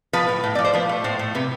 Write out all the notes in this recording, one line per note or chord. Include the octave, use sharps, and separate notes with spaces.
F3 B4
A2
A2
F3 D5
C5
F3 B4
A3
A2 C5
A2
C3 B4